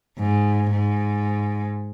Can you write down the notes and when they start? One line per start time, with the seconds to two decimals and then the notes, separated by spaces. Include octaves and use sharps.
0.18 G#2
0.70 G#2